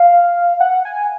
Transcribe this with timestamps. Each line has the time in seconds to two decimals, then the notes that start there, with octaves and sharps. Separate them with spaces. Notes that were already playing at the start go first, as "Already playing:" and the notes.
Already playing: F5
0.60 F#5
0.85 G#5